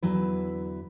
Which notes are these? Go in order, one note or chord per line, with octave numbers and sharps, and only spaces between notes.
E2 D3 F#3 E4 B4